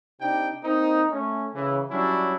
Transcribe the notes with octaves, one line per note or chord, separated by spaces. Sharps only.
C3 D4 D#4 G5
A#3 C4 D#4
A3 C#4
C#3 E3
F#3 G3 C#4 D4 E4